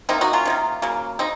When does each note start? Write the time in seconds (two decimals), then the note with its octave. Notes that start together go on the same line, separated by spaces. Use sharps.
0.09 C3 D#3 A#3 C4 D#4
0.21 D#4 F#4
0.33 C#4 F4
0.45 C3 D#3 A#3
0.82 C#3 F#3 A#3
1.19 C#3 C4 D#4